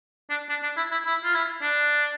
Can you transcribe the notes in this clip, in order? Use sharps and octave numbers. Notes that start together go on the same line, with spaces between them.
D4
D4
D4
E4
E4
E4
F4
E4
D4